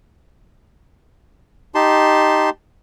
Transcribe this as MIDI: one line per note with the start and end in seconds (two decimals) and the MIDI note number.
1.75 2.50 63
1.75 2.50 67
1.75 2.50 81
1.75 2.50 84